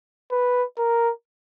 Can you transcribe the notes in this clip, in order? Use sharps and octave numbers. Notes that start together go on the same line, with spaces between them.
B4
A#4